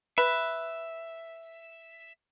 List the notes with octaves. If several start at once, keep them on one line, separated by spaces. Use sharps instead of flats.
B4 E5